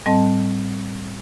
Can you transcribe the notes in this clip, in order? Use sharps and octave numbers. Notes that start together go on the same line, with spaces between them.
A2 G3 C4 D#5 A5